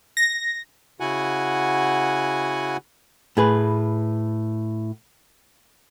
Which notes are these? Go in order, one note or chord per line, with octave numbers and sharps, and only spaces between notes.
A#6
C#3 E4 F#4 F#5 G#5
A2 G#4 B4